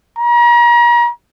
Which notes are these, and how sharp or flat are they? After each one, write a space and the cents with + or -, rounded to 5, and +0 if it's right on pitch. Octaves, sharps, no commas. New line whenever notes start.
A#5 +40